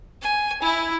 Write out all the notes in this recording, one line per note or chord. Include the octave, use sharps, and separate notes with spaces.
G#5
E4